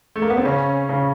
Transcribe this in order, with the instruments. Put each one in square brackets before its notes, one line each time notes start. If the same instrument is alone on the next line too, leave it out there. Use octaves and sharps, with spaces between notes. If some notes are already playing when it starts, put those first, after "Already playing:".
[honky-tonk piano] A3
A#3
B3
C4
[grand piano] C#3 [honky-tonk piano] C#4
[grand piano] C#3